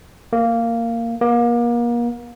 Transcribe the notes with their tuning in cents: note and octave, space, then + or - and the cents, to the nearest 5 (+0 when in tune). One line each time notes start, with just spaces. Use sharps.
A#3 -10
A#3 +35